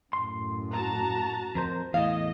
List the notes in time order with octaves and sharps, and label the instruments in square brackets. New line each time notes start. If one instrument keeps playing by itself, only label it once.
[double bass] F#2 A2 [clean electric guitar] C6
[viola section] F#4 A5 A#5
[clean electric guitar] F2 A#4 C5
[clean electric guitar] E2 A2 [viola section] D#5 [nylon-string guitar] F5